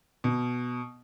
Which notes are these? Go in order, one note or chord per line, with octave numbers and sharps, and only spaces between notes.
B2